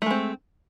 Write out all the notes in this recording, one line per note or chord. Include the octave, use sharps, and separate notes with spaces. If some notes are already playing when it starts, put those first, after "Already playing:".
G#3 A3 C4